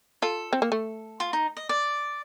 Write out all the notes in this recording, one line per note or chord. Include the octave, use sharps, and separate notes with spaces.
F4 A4
C4
A#3
A3
F4
D#4
D#5
D5